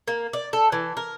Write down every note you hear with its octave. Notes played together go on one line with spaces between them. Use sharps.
A#3
D5
A4
E3
A#4